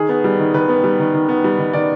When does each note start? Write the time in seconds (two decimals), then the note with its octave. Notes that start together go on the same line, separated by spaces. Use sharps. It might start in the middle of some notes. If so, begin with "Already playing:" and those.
Already playing: D#3 G#4
0.09 B3
0.24 G3
0.39 D#3
0.54 D#3 B4
0.69 B3
0.84 G3
0.99 D#3
1.14 D#3
1.29 B3
1.44 G3
1.59 D#3
1.73 D#3 D5